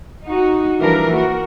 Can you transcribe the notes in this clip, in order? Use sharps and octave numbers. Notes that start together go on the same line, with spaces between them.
D#4 F#4
E3 F3 G3 D4 A#4
A#3 F#4 A#4